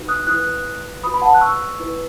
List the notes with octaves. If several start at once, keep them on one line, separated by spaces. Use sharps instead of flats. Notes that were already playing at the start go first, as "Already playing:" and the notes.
Already playing: D#4 F#4 B4
D#6 F#6
E4 B4 D#6 F#6
F#4 B4 B5 D#6
B5
F#5 A5
F#6
C#6 E6
E4 B4